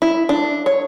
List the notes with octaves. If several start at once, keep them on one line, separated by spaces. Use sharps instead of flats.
E4
D4
C#5